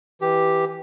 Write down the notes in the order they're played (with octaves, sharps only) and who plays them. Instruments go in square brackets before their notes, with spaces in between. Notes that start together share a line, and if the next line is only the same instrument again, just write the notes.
[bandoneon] E3 G4